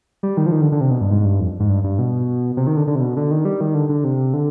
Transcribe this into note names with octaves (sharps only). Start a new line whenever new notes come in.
G3
D#3
F3
D#3
D3
D3
C3
B2
G2
G#2
G2
F2
G#2
G2
G2
B2
C3
D#3
D3
D3
C3
B2
D3
D#3
G3
D#3
D3
D3
C3
D3